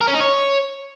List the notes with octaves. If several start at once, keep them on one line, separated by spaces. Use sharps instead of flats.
A#4
C#4
D#4
C#5